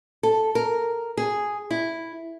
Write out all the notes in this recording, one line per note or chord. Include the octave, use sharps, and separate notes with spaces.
A4
A#4
G#4
E4